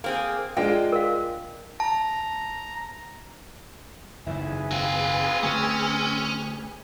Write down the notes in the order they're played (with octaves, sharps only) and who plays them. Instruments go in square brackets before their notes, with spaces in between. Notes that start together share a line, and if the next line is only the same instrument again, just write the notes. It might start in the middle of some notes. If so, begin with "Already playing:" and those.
[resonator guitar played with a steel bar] A#3 C4 G#4
[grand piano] G#3 D4 F4 [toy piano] E5 [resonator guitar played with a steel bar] G5
[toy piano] A#4 F5
[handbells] A5 [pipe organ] A#5
[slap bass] F#1 G#2 D#3 [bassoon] E4 [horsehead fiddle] G#4 B4
[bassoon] C4 [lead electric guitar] F#4 F5
[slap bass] D3 A3 [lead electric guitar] C#4